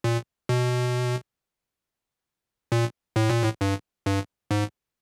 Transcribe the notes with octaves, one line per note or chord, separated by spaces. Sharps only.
A#2
B2
A#2
A2
A#2
A2
G2
G2
G#2